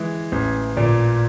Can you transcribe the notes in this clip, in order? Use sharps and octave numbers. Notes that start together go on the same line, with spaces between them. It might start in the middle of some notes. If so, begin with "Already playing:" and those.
Already playing: E3 G#3
A1
A#2 D5